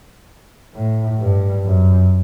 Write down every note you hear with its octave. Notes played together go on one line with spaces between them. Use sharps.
A2
G2
F#2